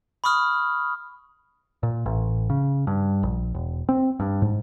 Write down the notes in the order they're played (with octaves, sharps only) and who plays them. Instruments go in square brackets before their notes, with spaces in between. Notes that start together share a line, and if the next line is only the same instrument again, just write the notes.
[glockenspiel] B5 C#6 D#6 F6
[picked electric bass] A#2
A1
C#3
G2
A#1
E1
C4
G2
G#2